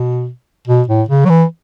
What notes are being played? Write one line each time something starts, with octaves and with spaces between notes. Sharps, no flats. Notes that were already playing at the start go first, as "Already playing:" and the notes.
Already playing: B2
B2
A2
C#3
F#3
E3